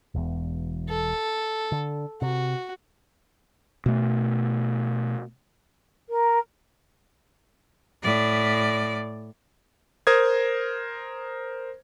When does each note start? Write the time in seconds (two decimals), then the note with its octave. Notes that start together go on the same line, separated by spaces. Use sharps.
0.15 E1 E2
0.89 A4
1.72 D3
2.22 C3 F#4
3.86 B2 A3
6.09 A#4
8.03 A2 D5
10.07 A#4 C5 D#6 G#6